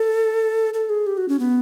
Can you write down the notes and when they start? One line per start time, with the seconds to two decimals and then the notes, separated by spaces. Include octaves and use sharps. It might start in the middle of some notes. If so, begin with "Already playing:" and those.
Already playing: A4
0.74 A4
0.89 G#4
1.07 G4
1.17 F#4
1.29 C#4
1.39 B3